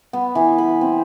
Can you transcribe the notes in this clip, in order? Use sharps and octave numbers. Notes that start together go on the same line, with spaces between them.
B3
E3
B5
C4